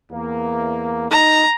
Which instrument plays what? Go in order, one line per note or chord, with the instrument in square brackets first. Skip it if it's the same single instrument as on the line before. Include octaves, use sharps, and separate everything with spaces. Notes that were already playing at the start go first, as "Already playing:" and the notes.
[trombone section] E2 A#3
[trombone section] D#4 [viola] A#5